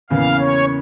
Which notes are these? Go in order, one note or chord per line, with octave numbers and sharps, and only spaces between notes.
E2 C#3 E3 A#3 F5
C#5